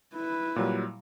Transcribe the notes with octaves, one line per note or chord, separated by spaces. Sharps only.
E4 B4
A#2 F#3 G3